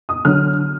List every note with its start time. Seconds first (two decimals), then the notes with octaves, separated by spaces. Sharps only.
0.09 D#6
0.25 D3 F#3 F6